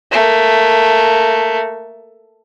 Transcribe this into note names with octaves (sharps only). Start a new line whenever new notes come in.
A3 A#3